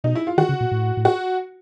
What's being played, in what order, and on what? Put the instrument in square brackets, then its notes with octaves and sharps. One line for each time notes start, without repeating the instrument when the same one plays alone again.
[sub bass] B2 [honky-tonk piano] D#4
[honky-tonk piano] E4
F4
[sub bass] D#3 [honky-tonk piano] F#4
[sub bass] C#3
A#2
A2
A2
[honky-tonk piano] F#4